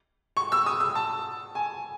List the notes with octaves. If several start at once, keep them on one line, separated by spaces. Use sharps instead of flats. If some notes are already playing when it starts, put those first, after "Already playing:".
C#6
E6
D#6
E6
A5
G#5